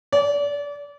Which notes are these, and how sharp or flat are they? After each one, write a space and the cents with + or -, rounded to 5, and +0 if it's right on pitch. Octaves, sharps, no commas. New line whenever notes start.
D5 -30